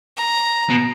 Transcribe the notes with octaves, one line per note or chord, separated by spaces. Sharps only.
A#5
B2